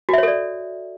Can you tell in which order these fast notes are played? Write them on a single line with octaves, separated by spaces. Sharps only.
F#4 E5 C#5 A4 D5